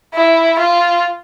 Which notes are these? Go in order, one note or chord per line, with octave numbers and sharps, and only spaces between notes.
E4
F4